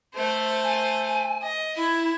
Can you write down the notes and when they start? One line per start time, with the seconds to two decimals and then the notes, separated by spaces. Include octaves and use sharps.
0.14 A3 C5
0.63 G#5
1.42 D#5
1.76 E4 E5